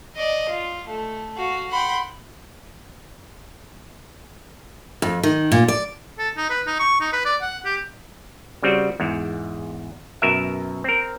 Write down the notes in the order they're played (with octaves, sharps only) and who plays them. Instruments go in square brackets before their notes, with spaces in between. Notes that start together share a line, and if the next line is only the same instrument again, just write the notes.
[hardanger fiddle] D5 D#5
F4
A3
[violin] F#4 [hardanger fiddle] F5
[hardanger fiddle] F#5 G5 [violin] B5 C6
[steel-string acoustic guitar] F2
D#3
A#2
D5
[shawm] A4
D#4
B4
D#4
C#6
D#4
B4
D5
F#5
G4
[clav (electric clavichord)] C#3 G3 C4 F#4
E2 G#2
F#2 B2 A#4 E5
C4 A#4